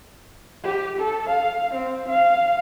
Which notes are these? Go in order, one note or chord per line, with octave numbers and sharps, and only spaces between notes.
G4
A4
F5
C4
F5